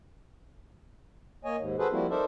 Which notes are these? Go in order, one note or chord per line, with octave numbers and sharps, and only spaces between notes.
A#3 C#5 D#5 G#5
D#2 G#2
F#4 G#4 A4 B4 C5
F3 G3 A#3 C4 E4 F#4
D#4 A4 A#4 C5 D5 E5